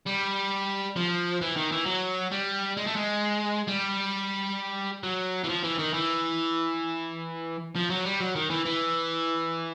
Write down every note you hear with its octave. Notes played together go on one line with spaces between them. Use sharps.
G3
F3
E3
D#3
E3
F#3
G3
G#3
A3
G#3
G3
F#3
E3
F3
E3
D#3
E3
F3
F#3
G3
F#3
D#3
E3
E3